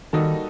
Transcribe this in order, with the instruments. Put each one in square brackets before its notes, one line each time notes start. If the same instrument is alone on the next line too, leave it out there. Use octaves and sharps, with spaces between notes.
[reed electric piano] D#3 [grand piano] G3 A#3 D#4 F#4 A4